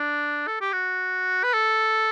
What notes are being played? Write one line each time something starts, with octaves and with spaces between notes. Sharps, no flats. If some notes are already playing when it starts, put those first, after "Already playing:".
Already playing: D4
A4
G4
F#4
B4
A4